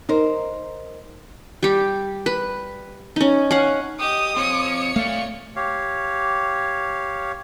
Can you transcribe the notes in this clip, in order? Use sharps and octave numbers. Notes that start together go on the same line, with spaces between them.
D#4 A#4 C5
G3 G4
B4
C#4 D#4
C#4 F5 F#5
G4 D#5 D#6
C4 F4 C#5 C#7
A3 D5 F5
G4 C#5 F5